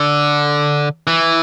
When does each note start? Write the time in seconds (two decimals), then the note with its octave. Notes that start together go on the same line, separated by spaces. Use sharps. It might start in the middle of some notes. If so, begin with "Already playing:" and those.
Already playing: D3
1.07 E3